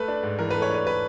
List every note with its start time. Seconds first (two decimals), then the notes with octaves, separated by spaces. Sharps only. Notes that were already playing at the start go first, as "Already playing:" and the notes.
Already playing: A3 B4
0.08 D4
0.23 G#2
0.39 E3 A#4
0.50 B4
0.55 A3
0.62 C#5
0.70 D4 B4
0.87 B4